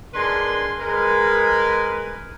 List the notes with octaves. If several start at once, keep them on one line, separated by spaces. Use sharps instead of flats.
G#3 D4 A#4 B4 C6
G#3 A#4 B4